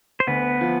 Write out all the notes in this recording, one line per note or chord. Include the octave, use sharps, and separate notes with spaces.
C5
D2 B3 B4
F3